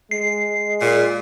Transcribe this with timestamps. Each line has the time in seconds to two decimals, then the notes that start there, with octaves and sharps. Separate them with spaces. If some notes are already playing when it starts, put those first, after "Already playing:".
0.11 G#3 C7
0.81 A#2 G#4